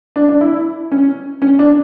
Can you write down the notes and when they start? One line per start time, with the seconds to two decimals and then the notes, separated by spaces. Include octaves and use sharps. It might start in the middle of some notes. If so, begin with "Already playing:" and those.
0.16 D4
0.29 D4
0.41 E4
0.92 C#4
1.42 C#4
1.59 D4